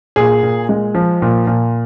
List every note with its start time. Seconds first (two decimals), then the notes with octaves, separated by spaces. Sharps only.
0.16 A#2 G#4
0.43 A#2
0.69 G#3
0.95 F3
1.22 A#2
1.47 A#2